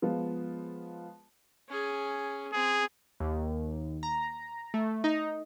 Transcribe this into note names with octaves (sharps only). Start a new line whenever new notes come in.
F3 G#3 B3 F4
C#4 G#4
C4 G#4
D#2
A#5
A3
D#4